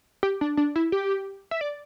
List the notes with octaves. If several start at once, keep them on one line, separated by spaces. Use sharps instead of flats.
G4
D4
D4
E4
G4
E5
D5